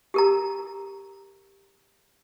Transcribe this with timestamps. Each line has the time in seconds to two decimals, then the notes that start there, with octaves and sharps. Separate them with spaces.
0.14 G4 A#4 A#5